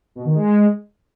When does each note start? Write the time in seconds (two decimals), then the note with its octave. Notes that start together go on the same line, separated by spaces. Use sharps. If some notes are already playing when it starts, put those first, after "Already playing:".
0.15 B2
0.25 D#3
0.35 G#3